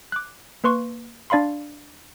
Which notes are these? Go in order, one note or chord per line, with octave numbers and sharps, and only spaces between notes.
D6 F#6
A#3 B4 C6 C#6
D4 D5 F5 B5 C6